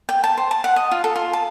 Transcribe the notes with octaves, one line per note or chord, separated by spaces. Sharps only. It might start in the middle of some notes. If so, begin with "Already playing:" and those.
G5
A5
C5
A5
F#5
D#5
F4
A4
F4
A5